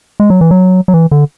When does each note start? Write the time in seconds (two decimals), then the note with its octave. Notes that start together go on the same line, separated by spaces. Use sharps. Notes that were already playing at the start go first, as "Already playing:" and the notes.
0.20 G#3
0.30 F#3
0.41 E3
0.51 F#3
0.88 F#3
0.94 E3
1.11 D3